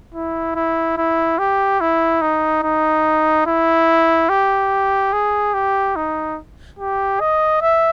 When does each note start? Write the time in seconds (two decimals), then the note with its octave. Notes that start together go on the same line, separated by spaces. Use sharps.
0.14 E4
0.55 E4
0.97 E4
1.39 G4
1.81 E4
2.22 D#4
2.63 D#4
3.47 E4
4.29 G4
5.13 G#4
5.54 G4
5.96 D#4
6.79 G4
7.20 D#5
7.62 E5